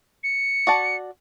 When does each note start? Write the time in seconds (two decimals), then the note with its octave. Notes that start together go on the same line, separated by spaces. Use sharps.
0.24 C#7
0.67 F#4 D5 A5